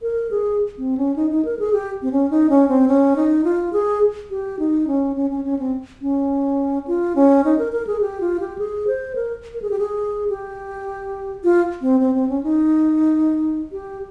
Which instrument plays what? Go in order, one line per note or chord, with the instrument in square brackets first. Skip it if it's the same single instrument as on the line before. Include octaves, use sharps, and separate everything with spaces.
[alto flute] A#4
G#4
C4
C#4
D#4
D#4
A#4
G#4
G4
C4
C#4
D#4
C#4
C4
C#4
D#4
F4
G#4
G4
D#4
C#4
C#4
C#4
C#4
C4
C#4
F4
C#4
D#4
A#4
A#4
G#4
G4
F4
G4
G#4
C5
A#4
A#4
G#4
G4
G#4
G4
F4
C4
C4
C4
C#4
D#4
G4